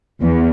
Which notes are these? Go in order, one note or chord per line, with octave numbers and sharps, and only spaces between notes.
E2